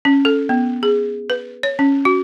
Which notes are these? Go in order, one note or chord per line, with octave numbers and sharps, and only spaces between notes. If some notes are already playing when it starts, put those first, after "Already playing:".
C#4
A4
B3
G#4
B4
C#5
C#4
F#4